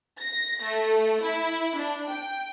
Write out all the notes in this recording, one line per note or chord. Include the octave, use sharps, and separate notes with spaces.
A#6
A3
E4
D4
G5